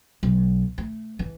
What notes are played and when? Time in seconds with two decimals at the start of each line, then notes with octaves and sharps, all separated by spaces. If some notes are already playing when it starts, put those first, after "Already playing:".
0.23 B1
0.78 A3
1.19 E3